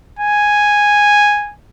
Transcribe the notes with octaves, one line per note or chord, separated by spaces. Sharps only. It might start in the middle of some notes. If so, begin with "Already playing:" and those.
G#5